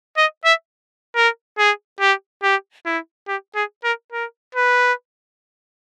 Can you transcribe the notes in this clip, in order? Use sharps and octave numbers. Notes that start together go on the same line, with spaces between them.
D#5
E5
A#4
G#4
G4
G4
E4
G4
G#4
A#4
A#4
B4